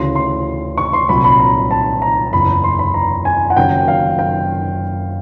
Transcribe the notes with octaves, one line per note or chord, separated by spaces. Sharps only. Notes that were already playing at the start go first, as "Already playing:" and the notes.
Already playing: D2 C#3 E3 C6
C6
C#6
C6
C2 A#2 F#3 B5
B5
A#5
A5
A#5
F#1 E2 C#3 B5
C6
B5
A#5
G#5
F#5
F#1 F#2 D#3 F#3 G5
F5
G5